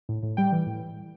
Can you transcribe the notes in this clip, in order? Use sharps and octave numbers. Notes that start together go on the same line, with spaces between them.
A2
A2
G3 G5
E3
A2